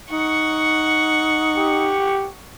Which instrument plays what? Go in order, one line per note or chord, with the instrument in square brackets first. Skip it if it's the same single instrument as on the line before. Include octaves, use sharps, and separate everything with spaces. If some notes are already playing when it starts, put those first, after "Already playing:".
[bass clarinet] D#4 [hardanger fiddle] F#5 C#6
[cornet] G4